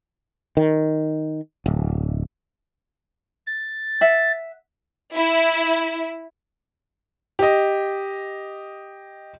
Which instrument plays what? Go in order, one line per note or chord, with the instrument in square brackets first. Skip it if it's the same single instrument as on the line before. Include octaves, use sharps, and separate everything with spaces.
[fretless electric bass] D#3
D1
[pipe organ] A6
[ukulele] E5 F#5
[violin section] E4
[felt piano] G4 D#5